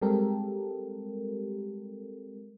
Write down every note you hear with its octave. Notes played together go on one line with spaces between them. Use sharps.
G3 G#3 C4 G4 A4 A#4